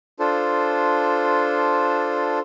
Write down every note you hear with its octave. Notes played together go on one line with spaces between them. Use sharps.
D4 F4 A4 C5